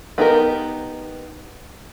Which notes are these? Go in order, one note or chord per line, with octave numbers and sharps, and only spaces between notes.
B3 D#4 G4 A#4